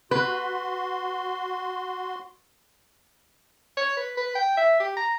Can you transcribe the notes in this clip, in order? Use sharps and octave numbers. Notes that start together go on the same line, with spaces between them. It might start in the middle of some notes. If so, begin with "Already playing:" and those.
F#4 B4 C6
C#5
B4
B4
G5
E5
G4
A#5